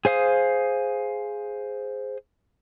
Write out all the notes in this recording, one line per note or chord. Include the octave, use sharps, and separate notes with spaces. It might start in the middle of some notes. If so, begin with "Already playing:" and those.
G#4 C5 F5 D#6